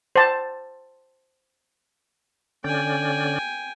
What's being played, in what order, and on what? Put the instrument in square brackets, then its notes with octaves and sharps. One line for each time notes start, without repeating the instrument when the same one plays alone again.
[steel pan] C5 A5
[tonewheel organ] D3 C#4 D5 [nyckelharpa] G5 G#5